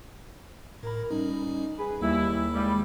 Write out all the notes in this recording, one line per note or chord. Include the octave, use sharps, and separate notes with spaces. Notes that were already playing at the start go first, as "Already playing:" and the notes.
A2 A#4 B5
G3 C#4 D#4
G#4 B4
D#2 G3 A#3 E4
G2 G3 G#3